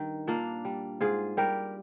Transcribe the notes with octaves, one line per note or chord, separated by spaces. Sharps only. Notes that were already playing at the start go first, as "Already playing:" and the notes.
Already playing: G2 D#3
A#2 A#3 D4
G3
G#2 F4 G#4
G3 G4 A#4